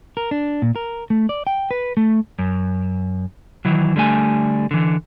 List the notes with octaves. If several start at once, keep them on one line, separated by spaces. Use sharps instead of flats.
A#4
D4
A#2
A#4
A3
D5
G5
B4
A3
F#2
D#3 E3 F#3
D3 G3 A3 G#5
D3 E3